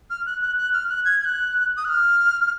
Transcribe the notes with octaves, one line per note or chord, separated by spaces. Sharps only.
F6
F#6
F#6
F#6
F6
F#6
G#6
G#6
F#6
D#6
F#6
F6